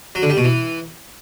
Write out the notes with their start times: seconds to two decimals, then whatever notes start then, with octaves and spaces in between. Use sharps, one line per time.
0.15 F#3
0.22 D3
0.30 G3
0.37 B2
0.44 E3